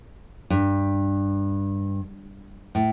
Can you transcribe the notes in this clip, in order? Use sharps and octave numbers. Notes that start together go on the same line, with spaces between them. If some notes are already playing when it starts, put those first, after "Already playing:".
G2
A2